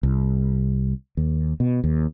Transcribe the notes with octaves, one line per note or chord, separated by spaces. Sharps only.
C2
D#2
B2
D#2